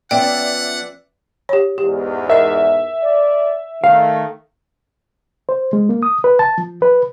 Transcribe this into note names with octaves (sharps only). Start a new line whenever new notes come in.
F3 B3 C#4 D5 E5 F#5 G5
G4 C#5
E2 G#2 G4
A#4 D#5 E5
D5
D#3 A3 F5
C5
G#3
A#3
D#6
B4
A5
F3
B4